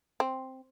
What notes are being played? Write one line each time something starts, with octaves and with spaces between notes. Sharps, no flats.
C4